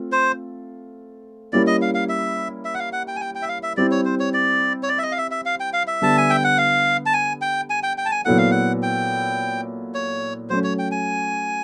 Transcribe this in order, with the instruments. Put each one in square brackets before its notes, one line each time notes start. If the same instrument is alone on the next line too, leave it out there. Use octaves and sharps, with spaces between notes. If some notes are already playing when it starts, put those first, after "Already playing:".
Already playing: [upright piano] A3 C4 F4
[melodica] C5
[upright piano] G3 A#3 C#4 E4 [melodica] D5
[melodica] D#5
F5
F5
E5
E5
F#5
F5
F#5
G5
G#5
G5
G5
E5
F5
E5
[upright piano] G3 C4 E4 [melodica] D5
[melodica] C#5
C5
C#5
D5
C#5
D5
E5
D#5
F5
E5
E5
F5
G5
F5
E5
[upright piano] D3 G3 B3 [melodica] A5
[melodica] G#5
G5
F#5
F5
A5
G#5
G5
G#5
G5
G5
A5
G#5
[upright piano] A#2 F#3 B3 E4 A4 [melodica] F#5
[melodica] F5
F#5
G5
C#5
[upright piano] F#3 A3 C#4 [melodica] C5
[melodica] C#5
G5
G#5